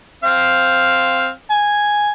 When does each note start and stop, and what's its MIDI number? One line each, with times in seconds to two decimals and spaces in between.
0.24 1.29 60
0.24 1.29 77
1.50 2.11 80